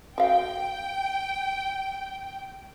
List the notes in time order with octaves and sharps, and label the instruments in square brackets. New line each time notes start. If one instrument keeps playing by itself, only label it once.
[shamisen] F#4 F5 [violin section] G5